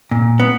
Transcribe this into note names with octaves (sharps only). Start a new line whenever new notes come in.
A#2
B3